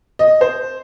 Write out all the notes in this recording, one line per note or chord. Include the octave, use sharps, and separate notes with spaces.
D#5
C5